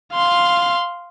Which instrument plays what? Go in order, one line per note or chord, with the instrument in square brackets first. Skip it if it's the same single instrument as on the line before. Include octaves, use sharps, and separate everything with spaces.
[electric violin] F5 C6